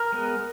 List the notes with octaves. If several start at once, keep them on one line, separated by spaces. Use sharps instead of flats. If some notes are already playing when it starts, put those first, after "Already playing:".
Already playing: A#4 A#5
G#3 B3